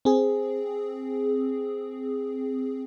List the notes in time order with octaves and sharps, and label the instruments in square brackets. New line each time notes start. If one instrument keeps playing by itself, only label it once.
[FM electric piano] C4 G#4